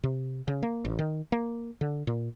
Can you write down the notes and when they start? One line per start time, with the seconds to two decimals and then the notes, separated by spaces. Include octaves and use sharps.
0.04 C3
0.48 C#3
0.63 A#3
0.85 A1
0.99 D#3
1.32 A#3
1.81 D3
2.07 A#2